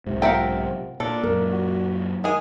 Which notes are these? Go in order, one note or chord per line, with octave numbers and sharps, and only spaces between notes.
B1 G#2 C3
F4 A#4 E5 F#5 G5
A#2 D4 A4
F#2 A#2 A#4
F#4
D#3 G#3 G#4